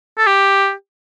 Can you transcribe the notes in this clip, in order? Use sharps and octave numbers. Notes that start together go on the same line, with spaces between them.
A4
G4